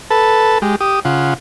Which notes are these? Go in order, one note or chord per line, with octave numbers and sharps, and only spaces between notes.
A4 B4 A5
G#3 G4
G4 D#6
C#3 F4 F#5